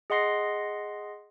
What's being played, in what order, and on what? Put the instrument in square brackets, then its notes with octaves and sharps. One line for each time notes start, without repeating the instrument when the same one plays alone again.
[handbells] G#4 D#5 F#5 C6 A#6 C7